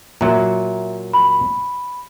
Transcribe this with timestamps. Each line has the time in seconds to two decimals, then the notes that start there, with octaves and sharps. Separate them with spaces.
0.21 A#2 F#3 E5 A#5
1.13 B5